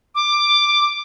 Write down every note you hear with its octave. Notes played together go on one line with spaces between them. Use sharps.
D6